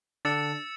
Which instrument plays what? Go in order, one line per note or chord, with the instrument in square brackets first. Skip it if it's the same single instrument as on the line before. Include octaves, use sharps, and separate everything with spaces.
[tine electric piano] D3 D4 [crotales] E6 A6 C#7 E7